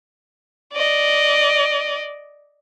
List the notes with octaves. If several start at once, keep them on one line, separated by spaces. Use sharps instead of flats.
D5 D#5